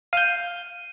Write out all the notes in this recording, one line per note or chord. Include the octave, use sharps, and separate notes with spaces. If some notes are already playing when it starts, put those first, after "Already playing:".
F5 G6 D#7